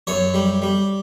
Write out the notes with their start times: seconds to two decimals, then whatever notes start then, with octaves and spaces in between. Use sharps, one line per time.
0.07 F#2 C#5
0.34 G3
0.62 G3